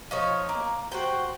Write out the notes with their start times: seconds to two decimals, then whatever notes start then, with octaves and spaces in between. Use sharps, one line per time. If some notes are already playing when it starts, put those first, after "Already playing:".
0.11 F3 D#4 C#5
0.49 A#3
0.92 F#4 C5 G5